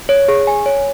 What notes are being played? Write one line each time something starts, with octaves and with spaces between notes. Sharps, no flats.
C#5
G#4
G#5
C#5